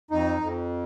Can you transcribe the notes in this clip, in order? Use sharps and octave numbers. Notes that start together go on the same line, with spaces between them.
F2 D#4
F2